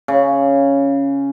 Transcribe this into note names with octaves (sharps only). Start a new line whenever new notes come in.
C#3